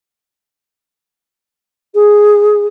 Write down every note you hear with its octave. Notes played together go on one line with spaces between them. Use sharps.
G#4